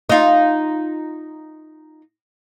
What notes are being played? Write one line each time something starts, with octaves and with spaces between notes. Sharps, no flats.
D#4 F4